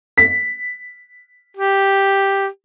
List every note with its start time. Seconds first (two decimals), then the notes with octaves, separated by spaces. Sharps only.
0.18 B6
1.57 G4